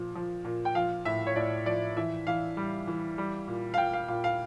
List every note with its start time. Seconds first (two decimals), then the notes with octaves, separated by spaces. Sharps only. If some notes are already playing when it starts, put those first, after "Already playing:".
Already playing: A#2 F3
0.15 F3
0.45 A#2
0.65 G5
0.75 F3 F5
1.05 A2 E5
1.27 C#5
1.36 A2 D5
1.66 F3 D5
1.97 E3 E5
2.27 E3 F5
2.57 G3
2.87 E3
3.18 G3
3.47 A#2
3.74 F5
3.78 A#2 G5
3.93 F5
4.08 A#2 F5
4.24 F5